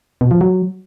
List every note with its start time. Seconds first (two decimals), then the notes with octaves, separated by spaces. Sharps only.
0.21 B2
0.31 F3
0.41 F#3